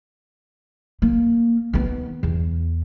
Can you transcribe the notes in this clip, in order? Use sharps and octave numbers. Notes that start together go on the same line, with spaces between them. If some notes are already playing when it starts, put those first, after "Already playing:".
A#3
D#3 B3
E2